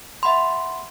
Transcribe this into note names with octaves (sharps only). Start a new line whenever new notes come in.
E5 F#5 B5 C6